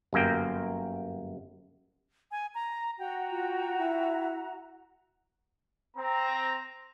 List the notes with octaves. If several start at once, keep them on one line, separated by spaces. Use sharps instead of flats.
G1 F#2 A#3 G5
G#5
A#5
F#4 G5 A#5
F4
E4
C4 A#5